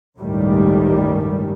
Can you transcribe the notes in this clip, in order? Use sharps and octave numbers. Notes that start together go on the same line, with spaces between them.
G1 C#2 A2 D#3 G3